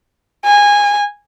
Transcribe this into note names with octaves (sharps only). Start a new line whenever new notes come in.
G#5